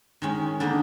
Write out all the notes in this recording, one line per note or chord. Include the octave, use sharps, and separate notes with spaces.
D#3 G#3 C#4
D3 G3 A#3 D#4